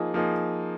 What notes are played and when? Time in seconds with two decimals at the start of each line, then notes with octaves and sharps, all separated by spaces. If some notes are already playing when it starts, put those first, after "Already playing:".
Already playing: F3 A#3 D#4 G#4
0.14 F3 A#3 D#4 G#4